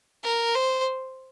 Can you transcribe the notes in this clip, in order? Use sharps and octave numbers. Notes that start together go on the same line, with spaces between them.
A#4
C5